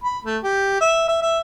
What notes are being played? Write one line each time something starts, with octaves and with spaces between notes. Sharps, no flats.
B5
A3
G4
E5
E5
E5